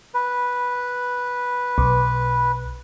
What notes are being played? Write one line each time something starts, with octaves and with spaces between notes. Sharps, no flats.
B4
B1